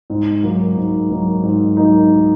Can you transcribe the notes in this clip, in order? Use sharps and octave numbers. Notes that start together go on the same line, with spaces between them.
G#2
F#3 A#3 D#4
G#2
F#3 A#3 D#4
G#2
F#3 A#3 D#4